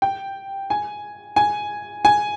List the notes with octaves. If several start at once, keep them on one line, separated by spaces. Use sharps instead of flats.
G5
G#5
G#5
G#5